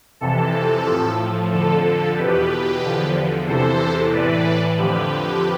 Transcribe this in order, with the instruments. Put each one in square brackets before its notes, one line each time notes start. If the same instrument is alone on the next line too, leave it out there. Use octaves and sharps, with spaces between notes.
[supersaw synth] F2 C3 E3 A4
A2 F3
F2 D3 F3 A4
A4
E2 B2 G4 B4
E2 D3 F3
E2 C3 E3 A4 C5
A2 E3 B4 D5
F2 D3 F3 G4 B4